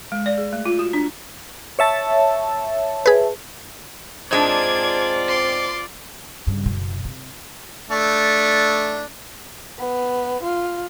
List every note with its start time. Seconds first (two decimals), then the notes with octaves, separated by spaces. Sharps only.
0.12 G#3
0.26 D5
0.38 G#4
0.53 A3
0.66 F4
0.79 F#4
0.93 D4
1.79 C#5 E5 A5
3.06 G#4 B4
4.31 G#2 G#3 C4 D4 F4 D5 A5 G#6
5.28 C6 D6
6.47 G2 C#3
6.63 F#1 B2
7.05 C3
7.91 A3 D4
9.79 B3
10.43 F4